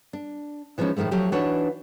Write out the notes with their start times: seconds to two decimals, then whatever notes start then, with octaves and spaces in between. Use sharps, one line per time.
0.13 D4
0.78 E3 F3 G#3 B3 C#4 D#4
0.97 A2 D#3 F3 G#3 A3
1.11 F3 F#3 A3 G4
1.32 E3 D4 D#4 F#4 B4 C#5